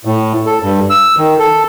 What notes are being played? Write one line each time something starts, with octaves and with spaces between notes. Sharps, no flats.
A2
A4
G2
E6
D#3
A4